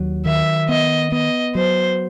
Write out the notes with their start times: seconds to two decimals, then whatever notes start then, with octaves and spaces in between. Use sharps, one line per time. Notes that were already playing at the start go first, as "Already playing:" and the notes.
Already playing: D#2 F#3
0.26 D#3 E5
0.69 B3 D#5
1.12 B3 D#5
1.55 F#3 C5